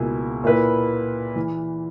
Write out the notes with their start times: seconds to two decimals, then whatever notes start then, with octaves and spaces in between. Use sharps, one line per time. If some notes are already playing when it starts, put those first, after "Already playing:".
Already playing: C#2 B2 A#3 E4 G#4
0.44 A#2 A#3 E4 B4
1.36 E3